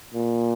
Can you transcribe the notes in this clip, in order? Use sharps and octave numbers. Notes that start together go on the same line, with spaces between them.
A#2